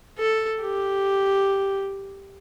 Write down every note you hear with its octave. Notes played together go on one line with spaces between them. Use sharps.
A4
G4